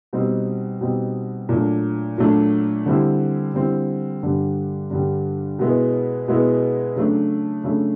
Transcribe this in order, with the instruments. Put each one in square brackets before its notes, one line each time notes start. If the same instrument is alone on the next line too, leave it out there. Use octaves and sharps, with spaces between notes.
[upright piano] B2 G3 C4 D#4
B2 G3 C4 D#4
A#2 F#3 A3 D4
A#2 F#3 A3 D4
D3 G3 C4 E4
D3 G3 C4 E4
G2 D3 G3
G2 D3 G3
B2 G#3 B3 E4
B2 G#3 B3 E4
C#3 F#3 A3 D4
C#3 F#3 A3 D4